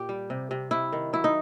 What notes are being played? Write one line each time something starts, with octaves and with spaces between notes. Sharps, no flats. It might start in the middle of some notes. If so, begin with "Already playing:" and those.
Already playing: A#2 G4
G3
C3
C3
C3 E4
D#3
F#3 E4
D#4